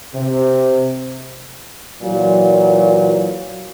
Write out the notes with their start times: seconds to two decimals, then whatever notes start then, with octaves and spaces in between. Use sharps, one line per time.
0.14 C3
2.02 A#2 E3 F#3